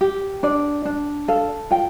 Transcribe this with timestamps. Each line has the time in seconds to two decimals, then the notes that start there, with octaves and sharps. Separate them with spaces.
0.01 G4
0.43 D4 D5
0.85 D4
1.28 A4 F5
1.71 F4 G5